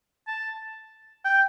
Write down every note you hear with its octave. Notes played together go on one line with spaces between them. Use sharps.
A5
G5